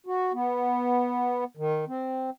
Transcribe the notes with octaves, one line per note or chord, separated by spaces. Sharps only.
F#4
B3
D#3
C4